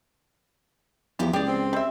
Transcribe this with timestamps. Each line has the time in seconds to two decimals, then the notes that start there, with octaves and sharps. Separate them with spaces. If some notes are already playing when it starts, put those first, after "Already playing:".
1.19 E2 C3 E3 F3 G4 A#5
1.33 C#2 G4 G#4 D5
1.48 C4
1.73 G3 E5